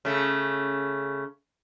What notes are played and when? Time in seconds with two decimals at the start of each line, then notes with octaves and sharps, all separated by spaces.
0.05 C#3 A3